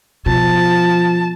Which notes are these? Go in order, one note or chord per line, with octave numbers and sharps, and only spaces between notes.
B2 F3 A5